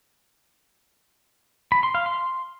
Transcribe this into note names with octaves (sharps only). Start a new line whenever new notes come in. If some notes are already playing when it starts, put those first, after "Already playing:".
B5
C6
F5
C6